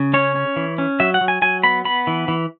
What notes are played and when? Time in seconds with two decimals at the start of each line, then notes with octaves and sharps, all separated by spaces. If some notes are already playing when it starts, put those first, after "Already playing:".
Already playing: C#3
0.14 C#4 C#5
0.36 C#4
0.56 E3
0.78 C#4
1.00 F#3 E5
1.14 F#5
1.21 F#3
1.28 G#5
1.42 F#3 G#5
1.64 B3 B5
1.85 B3 B5
2.07 E3
2.28 E3